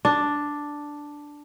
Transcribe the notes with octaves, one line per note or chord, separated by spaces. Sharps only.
D4